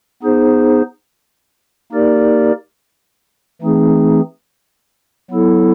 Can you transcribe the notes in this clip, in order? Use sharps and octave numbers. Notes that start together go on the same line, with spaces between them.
B3 D#4 G#4 C5
A#3 D#4 G4 A#4 D5
E3 A3 C4 D#4 G#4
F#3 B3 E4 A4